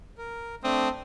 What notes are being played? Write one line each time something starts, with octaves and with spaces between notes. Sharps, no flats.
A#4
A3 C4 D4 D#6